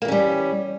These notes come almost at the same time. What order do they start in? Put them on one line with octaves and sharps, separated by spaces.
A#3 E3 C#4 G3